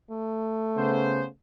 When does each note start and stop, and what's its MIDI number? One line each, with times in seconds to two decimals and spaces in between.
0.11 1.31 57
0.77 1.25 49
0.77 1.25 59
0.77 1.25 72